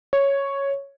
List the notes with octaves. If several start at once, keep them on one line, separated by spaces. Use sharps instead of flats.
C#5